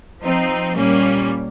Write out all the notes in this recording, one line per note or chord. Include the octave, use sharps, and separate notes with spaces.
F3 C4 D#4
A#2 G3 A#3 C#4